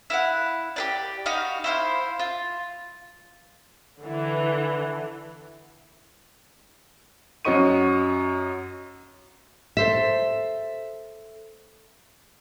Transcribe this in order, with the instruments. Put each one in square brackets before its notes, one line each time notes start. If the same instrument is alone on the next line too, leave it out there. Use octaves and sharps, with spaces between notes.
[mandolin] E4 F5 F#5
G4 B4 D5
D#4 F#4 F5 B5
E4 C5 F5
F4
[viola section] D3 E3
[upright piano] F#2 F#4 C#5 D#5 C#6 D#7
[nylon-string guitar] A4 C5 E5